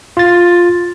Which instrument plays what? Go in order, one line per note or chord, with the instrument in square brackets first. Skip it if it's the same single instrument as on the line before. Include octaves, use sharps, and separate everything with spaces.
[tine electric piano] F4 A6